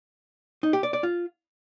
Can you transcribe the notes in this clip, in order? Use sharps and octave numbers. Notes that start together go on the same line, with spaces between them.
D#4
G4
D5
D5
F4